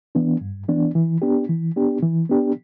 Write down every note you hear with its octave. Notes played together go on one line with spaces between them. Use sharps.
E3 B3 D4
G2
E3 B3 D4
E3
B3 D4 G4
E3
B3 D4 G4
E3
B3 D4 G4